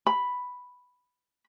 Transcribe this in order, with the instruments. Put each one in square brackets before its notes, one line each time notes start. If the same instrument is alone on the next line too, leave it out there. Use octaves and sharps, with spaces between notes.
[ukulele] B5